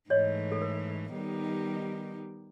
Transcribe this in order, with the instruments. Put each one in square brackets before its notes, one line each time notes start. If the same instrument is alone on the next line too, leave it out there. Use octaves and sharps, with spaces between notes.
[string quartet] G#2 E3 A3 [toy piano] C#5 D#5
[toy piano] A4
A#4
[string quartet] D#3 G3 B3 D#4 G4